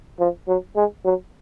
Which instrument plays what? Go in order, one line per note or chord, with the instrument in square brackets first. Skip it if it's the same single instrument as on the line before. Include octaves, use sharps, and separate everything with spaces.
[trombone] F3
F#3
G#3
F#3